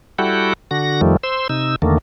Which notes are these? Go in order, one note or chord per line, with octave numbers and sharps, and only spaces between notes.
G3 E4 F#4 A4 F#5 G5
D3 F#4 A#6
F2 D#3 F3 G3 A3
C5 C6 E6
C3 D#4 E6
E2 D3 D#3 A3 A#3